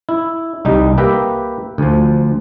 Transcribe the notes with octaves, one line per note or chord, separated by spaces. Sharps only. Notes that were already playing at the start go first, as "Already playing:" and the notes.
E4
C2 G3 D#4
A#3 G4 B4 E5 G5 A#5
D2 F3